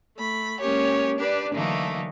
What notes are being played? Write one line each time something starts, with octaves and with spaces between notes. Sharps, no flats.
A3 B5
G#3 A#3 C#4 G4 C#5
D4 G4 B4 D5
D3 E3 F#3 A3 A#3 D#4